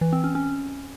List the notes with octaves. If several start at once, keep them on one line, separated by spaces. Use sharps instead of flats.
E3
C4
C#4
C#4